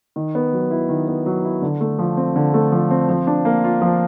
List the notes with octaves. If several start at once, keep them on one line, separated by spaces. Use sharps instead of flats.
D#3
B3
F#3
E4
D#3
B3
F#3
E4
D3
A3
F3
C4
D3
A3
F3
C4
F3
D4
A#3
F4
F3